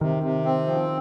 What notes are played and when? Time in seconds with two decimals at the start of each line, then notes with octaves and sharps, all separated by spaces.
0.01 C3 D#3
0.23 C3
0.45 C4
0.67 F3